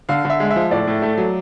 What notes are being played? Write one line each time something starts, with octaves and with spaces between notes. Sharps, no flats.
D3 F5
D3 E5
G#3
E5
F3
A2 D5
A2
A3
F#3